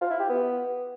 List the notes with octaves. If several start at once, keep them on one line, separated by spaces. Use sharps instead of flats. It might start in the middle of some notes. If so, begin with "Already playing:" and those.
F4
E4
G4
B3